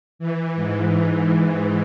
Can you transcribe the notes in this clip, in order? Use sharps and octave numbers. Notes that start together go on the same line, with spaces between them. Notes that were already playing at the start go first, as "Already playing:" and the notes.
E3
G#2